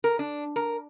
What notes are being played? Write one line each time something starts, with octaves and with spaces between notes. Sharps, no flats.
A#4
D4
A#4